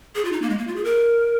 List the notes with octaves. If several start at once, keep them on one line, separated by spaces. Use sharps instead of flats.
G#4
F4
D#4
A#3
G#3
A#3
F4
G#4
A#4